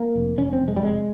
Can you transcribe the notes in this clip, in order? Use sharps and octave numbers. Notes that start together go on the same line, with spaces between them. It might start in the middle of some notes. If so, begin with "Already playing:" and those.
Already playing: A#3
F1
F1 C#4
C4
F1
G#3
G3
C3 G#3